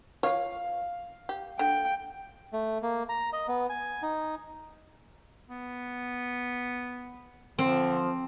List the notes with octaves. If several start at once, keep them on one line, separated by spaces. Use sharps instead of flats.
F4 C#5 F5
G4
D3 G5
A3
A#3
A#5
D#5
B3
G#5
D#4
B3
D3 F3 C4